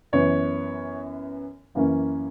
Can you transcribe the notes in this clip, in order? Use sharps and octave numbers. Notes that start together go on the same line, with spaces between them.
F#2 E3 B3 C#5
F#2 E3 A#3 C#4